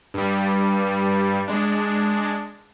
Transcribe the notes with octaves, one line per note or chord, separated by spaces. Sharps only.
G2 G3
G#3 D4